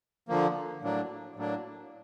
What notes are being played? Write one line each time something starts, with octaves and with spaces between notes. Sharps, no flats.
D3 F3 A#3
A2 F#3 A#3 D4
A2 F#3 A#3 D4